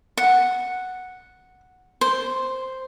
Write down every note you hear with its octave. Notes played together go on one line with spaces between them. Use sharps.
F#5
C5